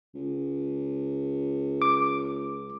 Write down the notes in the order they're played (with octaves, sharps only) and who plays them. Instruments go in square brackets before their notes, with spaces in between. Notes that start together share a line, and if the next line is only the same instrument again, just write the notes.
[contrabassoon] C#2
[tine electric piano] D6